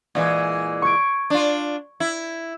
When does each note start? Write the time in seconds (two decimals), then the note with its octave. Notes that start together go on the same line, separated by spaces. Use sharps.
0.15 A#2 E3 G#3
0.82 C#6 G#6 D7
1.30 D4 F4
2.00 E4